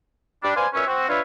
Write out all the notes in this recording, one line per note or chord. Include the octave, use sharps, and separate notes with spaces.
G3 D4
B4 C5 D5 F5 G#5
A#2 C#4 F#4 B4 C#5 E5
C4 F#4
D4 E4 F4 B4 C#5 E5